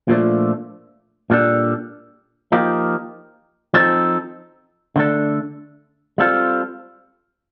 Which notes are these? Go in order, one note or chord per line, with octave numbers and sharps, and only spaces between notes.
A#2 F3 A3 D4
A#2 G3 D4 A4
F3 A#3 D#4 G4
F3 C4 D#4 A4
D3 A3 D4 A4
G3 C4 F4 A4